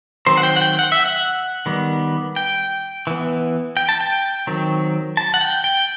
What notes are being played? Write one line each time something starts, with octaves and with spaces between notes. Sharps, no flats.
D#3 F#3 C4 C5
F#5
G5
F#5
G5
F#5
E5
F#5
D#3 G3 B3
G5
E3 B3
G5
A5
G5
D#3 F#3 C4
A5
F#5
G5
G5